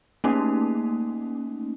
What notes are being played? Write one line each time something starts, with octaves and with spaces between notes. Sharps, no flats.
A3 A#3 C#4 D#4